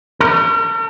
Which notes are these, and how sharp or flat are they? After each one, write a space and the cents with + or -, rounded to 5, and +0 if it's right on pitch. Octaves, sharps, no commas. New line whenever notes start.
A#4 -45